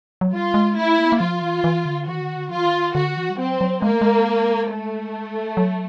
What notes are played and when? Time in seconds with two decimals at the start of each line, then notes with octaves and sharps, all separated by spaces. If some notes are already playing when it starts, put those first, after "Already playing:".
0.21 F#3
0.33 G3 F4
0.54 G#3
0.76 A3 E4
0.98 A#3
1.05 B3
1.12 A#3
1.20 F3 F4
1.42 E3
1.64 E3
1.85 D3
2.07 E3 F#4
2.15 D#3
2.21 D3
2.29 D#3
2.37 D3
2.50 F3 F4
2.58 E3
2.65 D#3
2.95 D3 F#4
3.17 E3
3.30 G3
3.39 F#3 C4
3.61 F#3
3.82 G#3 A#3
3.92 A3
4.01 G#3
4.70 A3
5.57 F#3